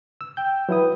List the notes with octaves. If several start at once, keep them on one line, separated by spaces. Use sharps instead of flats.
E6
G5 G6
F#3 E4 B4 D#6